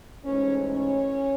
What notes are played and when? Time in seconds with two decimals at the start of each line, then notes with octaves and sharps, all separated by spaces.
0.24 G#2 E3 A3 C#4 C#5
0.67 C#4 C#5